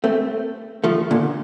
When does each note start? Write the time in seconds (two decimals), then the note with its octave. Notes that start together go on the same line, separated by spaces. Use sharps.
0.04 A3 C4
0.84 F3 A3
1.11 A#2 D3